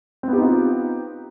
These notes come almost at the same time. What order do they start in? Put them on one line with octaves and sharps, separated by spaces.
C4 B3 G4 D#4 F4